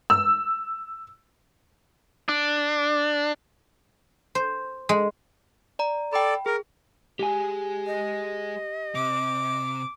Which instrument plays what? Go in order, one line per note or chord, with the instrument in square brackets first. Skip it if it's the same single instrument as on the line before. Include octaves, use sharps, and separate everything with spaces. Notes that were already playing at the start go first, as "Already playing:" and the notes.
[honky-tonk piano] E6
[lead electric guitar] D4
[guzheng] C5
G#3
[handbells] D5 A#5
[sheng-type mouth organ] A4 D5 [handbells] G5 B5
[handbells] G#4 [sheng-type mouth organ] A#4
[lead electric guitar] G#3 G#4 [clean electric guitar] G4 G#5
[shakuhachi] D#5
[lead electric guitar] C3 [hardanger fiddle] D6